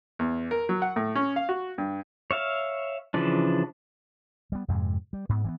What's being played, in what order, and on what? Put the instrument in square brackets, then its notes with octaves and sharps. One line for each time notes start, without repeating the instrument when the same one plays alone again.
[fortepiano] E2
A#4
F#3
F#5
A2
C#4
F5
F#4
G2
[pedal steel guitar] C#5 E5 F5
C#3 E3 F3 D4
[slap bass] G3 B3
F2 G#2 C3 G#3
G3
G#2 B3
E3 A#3 B3